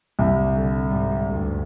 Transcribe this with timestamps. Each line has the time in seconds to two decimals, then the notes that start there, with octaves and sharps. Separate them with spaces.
0.19 C2
0.55 D3
0.86 G#2 G3
1.29 D2 G2